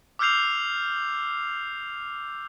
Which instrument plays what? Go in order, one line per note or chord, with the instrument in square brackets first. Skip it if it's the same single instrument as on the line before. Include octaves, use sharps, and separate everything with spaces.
[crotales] D6 E6 F6 G6 C7 F7